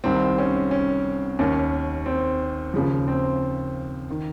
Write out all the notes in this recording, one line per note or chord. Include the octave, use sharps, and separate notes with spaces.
C2 C3 D#3 C4
C#4
C#4
D#2 D#3 C#4
C4
D#2 C#3 F3
C4
D#3